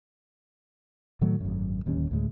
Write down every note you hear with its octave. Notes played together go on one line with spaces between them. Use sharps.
A2 D#3 F#3 A3
G#1 F#2
D1 D#2 G3 C#4
D2 A2 G#3